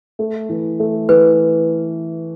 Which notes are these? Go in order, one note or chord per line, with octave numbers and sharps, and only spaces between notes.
A3
E3
A3
E3 B4